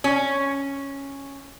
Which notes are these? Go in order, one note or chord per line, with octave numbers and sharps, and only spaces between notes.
C#4